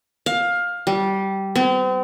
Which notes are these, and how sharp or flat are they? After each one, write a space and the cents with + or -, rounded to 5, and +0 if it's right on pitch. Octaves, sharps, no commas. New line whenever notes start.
F5 +15
G3 -15
C4 -40